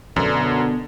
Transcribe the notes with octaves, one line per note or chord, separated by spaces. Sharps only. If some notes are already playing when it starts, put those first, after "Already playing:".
F#2 B2 D3 B3